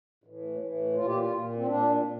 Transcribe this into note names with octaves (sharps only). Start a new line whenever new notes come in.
A2 E3
A2 E3
A#2 F4
G4
F4
A#2
C4
A#2 D4
A#2